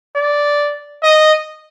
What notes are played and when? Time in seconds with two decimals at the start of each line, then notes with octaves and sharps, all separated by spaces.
0.15 D5
1.03 D#5